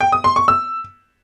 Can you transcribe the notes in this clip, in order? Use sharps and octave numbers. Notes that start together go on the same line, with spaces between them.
G5
D#6
C6
C#6
E6